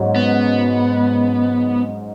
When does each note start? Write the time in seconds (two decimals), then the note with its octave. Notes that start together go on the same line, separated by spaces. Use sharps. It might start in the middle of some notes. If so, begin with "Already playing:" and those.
Already playing: G#2 F#3 C#4 F#4
0.16 B3